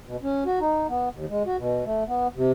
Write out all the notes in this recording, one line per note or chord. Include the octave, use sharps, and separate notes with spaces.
B2
C#4
F#4
D#4
B3
D#2
G#3
F#4
B2
A3
B3
C3